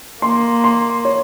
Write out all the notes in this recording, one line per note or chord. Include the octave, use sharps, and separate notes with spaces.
A#3 C6
C6
C#5